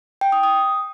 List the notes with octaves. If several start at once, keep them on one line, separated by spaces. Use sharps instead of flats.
G5
D#6
D#6